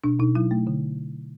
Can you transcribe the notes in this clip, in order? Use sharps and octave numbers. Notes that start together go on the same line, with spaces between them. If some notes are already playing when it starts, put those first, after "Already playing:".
B2 D4
B2 D#4
F#3 E4
A3
D3